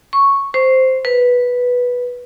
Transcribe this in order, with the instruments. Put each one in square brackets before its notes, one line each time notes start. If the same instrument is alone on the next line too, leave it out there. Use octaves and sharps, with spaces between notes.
[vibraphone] C#6
C5
B4